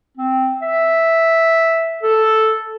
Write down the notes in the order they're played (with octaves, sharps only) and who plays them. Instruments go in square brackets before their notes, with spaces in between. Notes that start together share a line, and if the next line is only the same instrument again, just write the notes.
[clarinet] C4
E5
A4